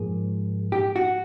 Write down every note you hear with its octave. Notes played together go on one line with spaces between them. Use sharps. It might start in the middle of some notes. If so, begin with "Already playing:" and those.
Already playing: G#2 F3 A#3 G#4
G4
F#4